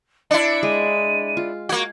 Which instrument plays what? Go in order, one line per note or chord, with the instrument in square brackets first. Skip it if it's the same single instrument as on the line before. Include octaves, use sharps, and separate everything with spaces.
[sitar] D4 E4 [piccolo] C#7
[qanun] G#3 [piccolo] D#7
[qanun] F4
[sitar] A#3 F#4 [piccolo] G#6